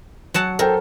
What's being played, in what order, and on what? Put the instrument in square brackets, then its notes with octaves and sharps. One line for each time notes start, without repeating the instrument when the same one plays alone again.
[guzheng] F#3 F#5 A5
[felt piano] A4 C5 G5 [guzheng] A#4